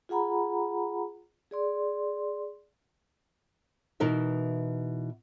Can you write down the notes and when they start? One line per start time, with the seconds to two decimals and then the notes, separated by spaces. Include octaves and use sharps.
0.09 F4 G#4 F#5 A#5 B5
1.51 G#4 D5 C6
4.00 B2 E3 D#4 A#4 E5